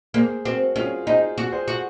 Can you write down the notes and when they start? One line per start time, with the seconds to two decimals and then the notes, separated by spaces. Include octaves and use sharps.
0.14 A#3 G#4 C5
0.45 C4 F#4 A#4
0.76 C#4 F4 G#4
1.06 D#4 G#4 C5
1.38 F#4
1.52 G#4 C5
1.68 F#4